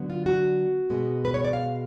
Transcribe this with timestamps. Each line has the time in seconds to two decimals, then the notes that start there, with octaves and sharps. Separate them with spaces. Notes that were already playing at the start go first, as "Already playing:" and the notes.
Already playing: D3 F#3 B3
0.10 F4
0.26 F#4
0.90 B2 G#3 B3
1.25 B4
1.34 C#5
1.44 D5
1.53 F5